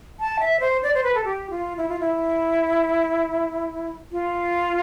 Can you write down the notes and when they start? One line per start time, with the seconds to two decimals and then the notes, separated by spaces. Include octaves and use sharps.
0.20 A5
0.40 E5
0.60 C5
0.83 D5
0.94 C5
1.04 B4
1.15 A4
1.24 G4
1.50 F4
1.77 E4
1.88 F4
2.00 E4
4.12 F4